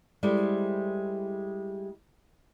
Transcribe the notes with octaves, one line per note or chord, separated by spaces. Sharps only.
G3 G#3 E4 A4 C5